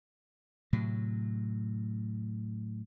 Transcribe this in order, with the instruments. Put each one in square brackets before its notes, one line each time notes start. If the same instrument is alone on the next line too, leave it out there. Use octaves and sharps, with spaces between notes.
[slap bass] A2 C3 F#3